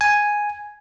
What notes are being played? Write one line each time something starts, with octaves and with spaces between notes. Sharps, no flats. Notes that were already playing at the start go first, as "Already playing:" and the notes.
G#5